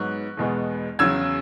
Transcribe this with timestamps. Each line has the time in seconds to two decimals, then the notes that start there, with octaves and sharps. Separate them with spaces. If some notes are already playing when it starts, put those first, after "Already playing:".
Already playing: G#2 F#3 B3 C#6 F#6
0.37 E2 B2 G#3 B3
0.99 E2 C#3 F#3 E6 G#6